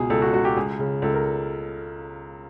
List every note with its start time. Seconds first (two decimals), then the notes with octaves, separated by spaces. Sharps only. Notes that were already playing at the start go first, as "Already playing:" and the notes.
Already playing: C#2 B2 G#4
0.10 C#2 A4
0.22 F#4
0.33 C#2 F#4
0.45 G4
0.57 C#2 G#4
0.79 C#3
1.02 C#2 A4
1.14 A#4